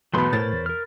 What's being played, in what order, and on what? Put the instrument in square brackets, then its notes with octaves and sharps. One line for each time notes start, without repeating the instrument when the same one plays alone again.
[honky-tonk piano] E2 B2 [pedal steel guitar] F#3 A3 C6 [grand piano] B4 B5
[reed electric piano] A2 [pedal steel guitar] A#4 C5 C#5 [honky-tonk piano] A6
[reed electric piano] E2
[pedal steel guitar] A#4 F6